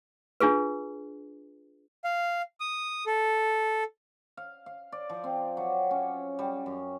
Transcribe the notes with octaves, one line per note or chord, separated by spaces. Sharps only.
D4 F4 G#4 B4
F5
D#6
A4
F5
F5
D5
F3
C4
F#3
C#4
G3
F#2